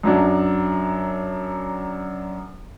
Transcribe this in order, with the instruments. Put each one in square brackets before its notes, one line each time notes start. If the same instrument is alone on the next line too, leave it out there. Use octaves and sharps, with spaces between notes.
[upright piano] F#2 F#3 D4